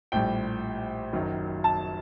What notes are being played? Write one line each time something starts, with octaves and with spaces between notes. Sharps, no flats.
A#1 A2 G3 G5
F#1 F#2 D#3 F#3
A5